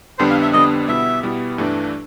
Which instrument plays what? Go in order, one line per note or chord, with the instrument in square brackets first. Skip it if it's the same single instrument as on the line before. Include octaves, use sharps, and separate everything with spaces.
[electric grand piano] F2 D3 G3 B3 D4 [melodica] C5
[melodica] F5
E5
[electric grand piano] F2 D3 G3 B3 D4 [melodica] D#5
[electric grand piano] B2 G3 B3 E4 [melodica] E5
[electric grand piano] B2 G3 B3 E4
G2 E3 A3 D4